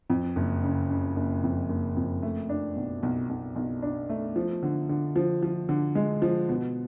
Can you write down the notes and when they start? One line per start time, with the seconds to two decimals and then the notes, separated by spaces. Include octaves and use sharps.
0.10 F2
0.36 F#1
0.63 C#3
0.90 C#3
1.16 F#1
1.44 F2
1.69 F#1
1.96 F2
2.23 A3
2.49 D4
2.76 B1
3.03 B1
3.29 B1
3.56 B1
3.82 D4
4.09 A3
4.36 F3
4.63 D3
4.89 D3
5.16 F3
5.43 F3
5.69 D3
5.95 G#3
6.22 F3
6.49 B2